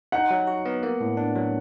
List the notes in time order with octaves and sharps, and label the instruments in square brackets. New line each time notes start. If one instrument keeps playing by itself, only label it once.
[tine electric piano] D#4 [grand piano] F#5
[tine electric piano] F#3
F#4
B3
A#3
A2
D4
F#3